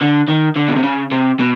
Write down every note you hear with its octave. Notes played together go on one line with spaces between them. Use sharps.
D3
D#3
D3
B2
C3
C#3
C3
B2